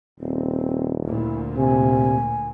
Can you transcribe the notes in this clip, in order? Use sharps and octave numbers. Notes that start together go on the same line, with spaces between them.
D#1 C4
D2 A#2 E4
C3 G#5